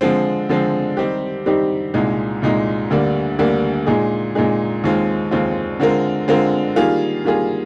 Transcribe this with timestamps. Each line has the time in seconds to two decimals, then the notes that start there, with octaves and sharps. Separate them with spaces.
0.01 D3 F3 G#3 C4
0.49 D3 F3 G#3 C4
0.97 D#3 G3 C4 D#4 G4
1.46 D#3 G3 C4 D#4 G4
1.94 C2 A#2 G#3 D#4
2.42 C2 A#2 G#3 D#4
2.90 D2 D3 G3 A#3 D4
3.39 D2 D3 G3 A#3 D4
3.86 A#2 G#3 D#4 G#4
4.35 A#2 G#3 D#4 G#4
4.84 D#2 D#3 G#3 C4 F4
5.31 D#2 D#3 G#3 C4 F4
5.80 D3 G#3 C4 F4 A#4
6.28 D3 G#3 C4 F4 A#4
6.76 D#3 G3 A#3 F4 G#4
7.24 D#3 G3 A#3 F4 G#4